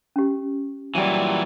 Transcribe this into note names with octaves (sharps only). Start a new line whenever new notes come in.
C#4 G4
A#2 E3 F#3 G3